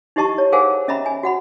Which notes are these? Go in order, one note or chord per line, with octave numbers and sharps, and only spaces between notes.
D#4 E4 G4 D#5 A5 C#6
C#5
G#4 A#4 C5 F5 F#5 G#5
C#4 D#5 E5 A#5 B5
G#5
F#4 F#5 B5